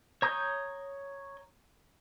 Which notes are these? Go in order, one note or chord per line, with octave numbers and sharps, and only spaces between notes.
C#5 A#5 D#6 G6